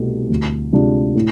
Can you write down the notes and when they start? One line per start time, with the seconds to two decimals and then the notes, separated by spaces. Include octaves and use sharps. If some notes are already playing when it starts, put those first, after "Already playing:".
Already playing: C2 B2 A3
0.30 D2
0.73 C3 G#3 D4 F4
1.15 A2